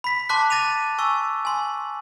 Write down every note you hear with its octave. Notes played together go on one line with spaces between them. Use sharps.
B5 B6
A5 C6 D6 F#6 B6
A6 A#6 D#7 F7
G#5 C#6 E6
G#5 C6